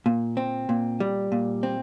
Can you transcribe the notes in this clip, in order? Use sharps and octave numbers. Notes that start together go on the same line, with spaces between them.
A#2
C4
A#2
G3
A#2
C4